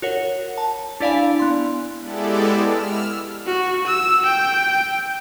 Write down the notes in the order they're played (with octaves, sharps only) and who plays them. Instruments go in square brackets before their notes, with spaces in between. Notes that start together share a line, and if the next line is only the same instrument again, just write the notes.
[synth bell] F#4 A#4 C#5 F#5
A5
D4 E4 D5 F5 G#5 B5
B3 C6
[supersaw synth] G#3 B3 E4 G4 A4 D5
E6 F6
[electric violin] F#4
E6
G5